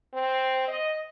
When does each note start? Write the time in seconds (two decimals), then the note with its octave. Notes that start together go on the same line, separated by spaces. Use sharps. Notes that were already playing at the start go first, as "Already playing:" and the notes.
0.14 C4
0.68 D#5